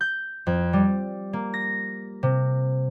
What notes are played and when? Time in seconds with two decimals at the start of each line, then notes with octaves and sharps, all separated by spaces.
0.01 G6
0.47 F2
0.73 G3
1.33 A#3
1.54 A#6
2.23 C3